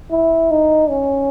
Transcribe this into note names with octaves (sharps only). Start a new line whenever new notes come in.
E4
D#4
C#4